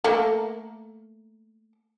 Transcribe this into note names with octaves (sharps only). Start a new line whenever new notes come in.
A3 A#3